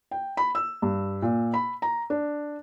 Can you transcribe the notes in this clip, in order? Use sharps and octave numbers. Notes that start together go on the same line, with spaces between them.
G5
B5
E6
G2
A#2
B5
A#5
D4